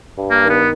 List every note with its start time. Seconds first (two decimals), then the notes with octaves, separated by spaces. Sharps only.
0.18 G2
0.31 A#3
0.43 D#3
0.49 B3